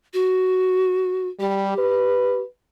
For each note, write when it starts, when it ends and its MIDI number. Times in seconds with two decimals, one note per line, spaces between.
0.14 1.28 66
1.40 1.77 55
1.40 2.41 67
1.78 2.45 71